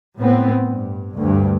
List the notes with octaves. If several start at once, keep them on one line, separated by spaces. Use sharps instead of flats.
A2 B3 C4
G2
D2 G2